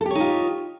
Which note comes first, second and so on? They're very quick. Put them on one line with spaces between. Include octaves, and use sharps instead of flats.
A4 G4 C#5 D#4 F4